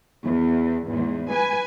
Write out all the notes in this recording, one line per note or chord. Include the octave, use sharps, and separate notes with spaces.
E2
E2 G#2
B4 G#5